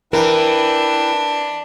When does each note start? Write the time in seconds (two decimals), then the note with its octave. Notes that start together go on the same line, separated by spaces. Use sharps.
0.13 E3 D4 E4 A#4 B4 G5